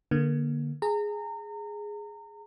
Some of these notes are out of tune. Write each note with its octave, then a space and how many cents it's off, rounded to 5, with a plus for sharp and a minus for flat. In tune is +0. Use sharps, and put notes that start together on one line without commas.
D3 +0 A#3 +25
G#4 +0 A#5 -30